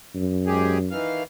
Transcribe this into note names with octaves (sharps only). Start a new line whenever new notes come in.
F#2
G#2 G4 G#4
D#3 E3 F5